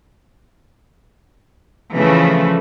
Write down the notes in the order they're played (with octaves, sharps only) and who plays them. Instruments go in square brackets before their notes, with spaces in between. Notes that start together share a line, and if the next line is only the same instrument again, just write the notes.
[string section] C#3 E3 F3 A3